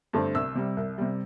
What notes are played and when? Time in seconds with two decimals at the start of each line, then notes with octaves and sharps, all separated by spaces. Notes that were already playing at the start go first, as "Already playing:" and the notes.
0.13 G2 D3 A3 C4
0.35 C2 E6
0.55 C3 G3
0.77 C2
0.98 C3 G3